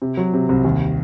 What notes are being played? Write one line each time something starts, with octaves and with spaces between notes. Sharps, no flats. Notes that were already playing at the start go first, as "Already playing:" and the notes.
C3
F#3
C3
C2
D#2